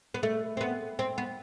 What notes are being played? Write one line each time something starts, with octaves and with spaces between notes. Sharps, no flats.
B3
A3
C4
B3
C4
B3